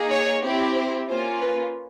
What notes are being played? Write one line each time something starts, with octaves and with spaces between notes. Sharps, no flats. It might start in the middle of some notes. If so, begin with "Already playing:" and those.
Already playing: A#3 D#4 G#4
C#5
C4 E4 G4
C5
A#3 C#4 F4 C5
B4